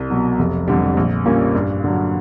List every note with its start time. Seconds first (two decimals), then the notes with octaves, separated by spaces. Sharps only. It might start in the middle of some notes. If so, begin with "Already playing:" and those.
Already playing: C2
0.10 B2 F#3
0.39 F1
0.68 F2 D3 G3
0.97 A#1
1.25 A#2 G3 A#3 C#4
1.55 G2
1.84 D3 F#3